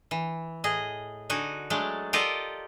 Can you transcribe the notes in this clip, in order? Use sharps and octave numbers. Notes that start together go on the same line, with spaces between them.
E3
A2 G#4 D#5
D3 D#4 F#4 G#5
F#3 G#3 A3 D4
F4 G4 A4 A#4 D5 D#5